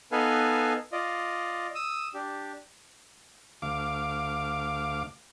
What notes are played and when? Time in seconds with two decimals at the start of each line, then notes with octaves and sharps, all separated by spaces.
0.12 B3 D#4 A4 B4 F5 G#5
0.92 F4 D5 D#5
1.75 D#6 E6
2.14 D4 G4
3.62 D2 F5 D6